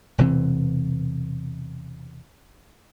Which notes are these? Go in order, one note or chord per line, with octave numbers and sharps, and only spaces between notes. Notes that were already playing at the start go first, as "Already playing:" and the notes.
E1 C3 E3 C4